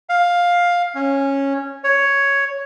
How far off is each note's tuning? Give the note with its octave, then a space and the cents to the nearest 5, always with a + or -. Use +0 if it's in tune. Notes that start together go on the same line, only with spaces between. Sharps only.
F5 +10
C#4 -10
C#5 +5